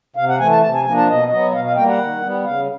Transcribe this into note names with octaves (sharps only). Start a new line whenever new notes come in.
C3 F5
F#5
E3 A3 G#5
A5
C3 A5
G#5
F3 A#3 D4 G#5
A5
B2 D#5
F#3 B3 D#5
B2 F5
F5
G3 A#3 G5
F#5
D#3
G3 B3
C#3 F5